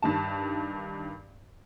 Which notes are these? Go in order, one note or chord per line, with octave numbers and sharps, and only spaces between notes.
G2 D#3 A5